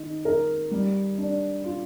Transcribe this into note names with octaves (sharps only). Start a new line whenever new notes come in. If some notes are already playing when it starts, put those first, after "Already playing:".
Already playing: D#3 D#4
A#4
G3
D4
F4